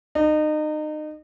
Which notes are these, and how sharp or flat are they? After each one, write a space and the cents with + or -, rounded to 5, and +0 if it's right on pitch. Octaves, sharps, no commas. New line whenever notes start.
D#4 -30